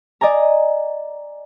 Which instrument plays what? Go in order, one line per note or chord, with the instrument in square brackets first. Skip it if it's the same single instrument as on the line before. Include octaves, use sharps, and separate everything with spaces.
[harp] D5 D#5 G#5 A#5